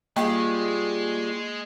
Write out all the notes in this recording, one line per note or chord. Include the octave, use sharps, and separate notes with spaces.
G3 G#3 A#3 F4 G#4 G5